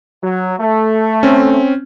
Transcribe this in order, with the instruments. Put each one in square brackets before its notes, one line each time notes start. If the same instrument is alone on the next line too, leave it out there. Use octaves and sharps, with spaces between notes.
[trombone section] F#3
A3
[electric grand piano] C4 C#4